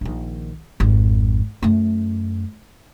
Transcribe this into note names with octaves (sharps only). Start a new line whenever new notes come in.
A#1 D#3
G#1 F2
F#2 A3